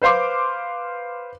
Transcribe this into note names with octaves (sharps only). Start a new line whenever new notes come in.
B4 C5 F5 C6 D6